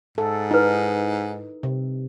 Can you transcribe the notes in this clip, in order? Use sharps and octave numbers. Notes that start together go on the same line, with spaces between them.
G#2 A4
D#4 E4 B4
C3